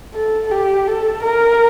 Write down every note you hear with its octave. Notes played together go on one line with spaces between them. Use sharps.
A4
G4
A4
A#4